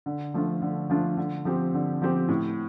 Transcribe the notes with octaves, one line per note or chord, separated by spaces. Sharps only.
D3
F3 A3 D4 F4
D3
F3 A3 D4 F4
D3
F3 C4 G4
D3
F3 C4 G4
A2